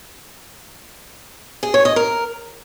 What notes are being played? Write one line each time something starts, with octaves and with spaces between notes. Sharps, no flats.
G#4
C#5
D#5
A#4